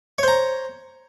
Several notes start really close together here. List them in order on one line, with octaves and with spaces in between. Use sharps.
C#5 C5 A#5